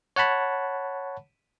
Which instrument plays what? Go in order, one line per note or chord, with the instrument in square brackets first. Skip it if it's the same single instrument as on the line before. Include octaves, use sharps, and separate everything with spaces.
[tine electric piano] C#5 F#5 A5 B5